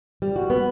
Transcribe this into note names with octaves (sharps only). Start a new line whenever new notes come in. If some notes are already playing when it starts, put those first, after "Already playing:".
G3
F#4
B3